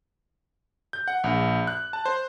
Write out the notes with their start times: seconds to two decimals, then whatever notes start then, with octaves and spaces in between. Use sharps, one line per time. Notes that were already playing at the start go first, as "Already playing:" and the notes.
0.93 G6
1.08 F#5
1.24 A#1
1.67 F#6
1.93 A5
2.06 C5